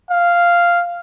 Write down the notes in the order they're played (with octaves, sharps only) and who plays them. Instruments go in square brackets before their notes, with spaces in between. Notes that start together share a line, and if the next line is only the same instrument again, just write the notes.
[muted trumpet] F5